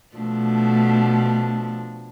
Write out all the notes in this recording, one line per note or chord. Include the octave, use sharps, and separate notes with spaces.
B2 F3 A3 D4